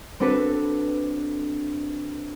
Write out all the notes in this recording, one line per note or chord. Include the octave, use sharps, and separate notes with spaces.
C4 D4 F#4 A4 B4